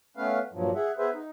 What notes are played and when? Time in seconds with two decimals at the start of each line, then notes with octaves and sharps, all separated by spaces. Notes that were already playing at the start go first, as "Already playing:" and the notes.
0.17 A3 B3 C#4 B4 F5
0.53 G2 A#2 F3 F#3
0.75 G#4 E5 F#5
0.98 B3 G#4 B4 C5 E5
1.13 D#4